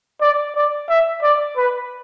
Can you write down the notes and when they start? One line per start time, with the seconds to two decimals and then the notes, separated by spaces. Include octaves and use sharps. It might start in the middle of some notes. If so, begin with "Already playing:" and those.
0.21 D5
0.56 D5
0.89 E5
1.23 D5
1.57 B4